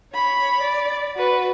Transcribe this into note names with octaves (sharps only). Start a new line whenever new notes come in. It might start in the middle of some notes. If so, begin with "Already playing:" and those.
C#5 B5
D5
F#4 B4